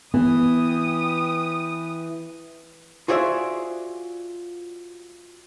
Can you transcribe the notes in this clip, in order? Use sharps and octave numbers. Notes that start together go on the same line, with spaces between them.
E3 B3 G4 D#6
F4 F#4 G#4 C5 D5 E5